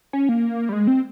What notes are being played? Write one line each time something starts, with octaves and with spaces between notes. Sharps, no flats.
C#4
A#3
G3
G#3
C4